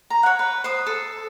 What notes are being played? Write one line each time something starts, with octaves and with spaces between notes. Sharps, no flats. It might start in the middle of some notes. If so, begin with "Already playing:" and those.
A#5
C#5 F#5
B4
C5 D#6
A4